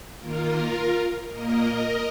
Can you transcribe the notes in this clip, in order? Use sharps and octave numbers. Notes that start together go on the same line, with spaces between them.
D#3 A#3 F4 A#4
A#2 A#3 A#4 D#5